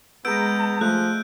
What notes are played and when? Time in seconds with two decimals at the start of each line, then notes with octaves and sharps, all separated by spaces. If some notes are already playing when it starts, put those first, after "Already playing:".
0.25 G#3 B3 A#5 E6 G6 D7
0.81 F3 G#3 A3 F#6